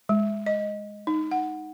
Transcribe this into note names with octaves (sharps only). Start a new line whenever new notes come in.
G#3
D#5
D#4
F#5